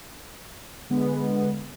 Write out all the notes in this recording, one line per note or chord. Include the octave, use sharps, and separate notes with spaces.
D3 G#3 B3